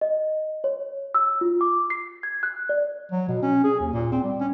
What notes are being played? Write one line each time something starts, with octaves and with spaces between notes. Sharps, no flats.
D#5
C#5
E6
F4
D6
C7
G#6
F#6
D5
F#3
B2
C#4
G#4
D#2
A#2
C4
G3
C#4